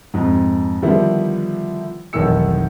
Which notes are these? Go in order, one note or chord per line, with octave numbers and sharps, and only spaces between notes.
F2 G#2
D3 D#3 F3 G3 B3 E4
F1 B1 D#3 E3 E6 C#7